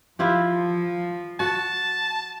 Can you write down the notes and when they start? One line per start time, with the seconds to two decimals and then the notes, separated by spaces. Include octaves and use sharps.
0.19 F3 E4 F4 G4
1.40 F#4 A5